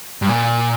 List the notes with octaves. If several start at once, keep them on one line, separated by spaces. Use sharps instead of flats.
G2
A#2